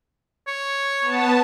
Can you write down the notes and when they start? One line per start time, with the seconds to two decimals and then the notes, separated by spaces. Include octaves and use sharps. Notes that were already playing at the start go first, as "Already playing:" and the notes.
0.47 C#5
1.01 B3 A5